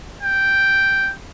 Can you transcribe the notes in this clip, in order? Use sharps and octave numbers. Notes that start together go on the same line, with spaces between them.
G5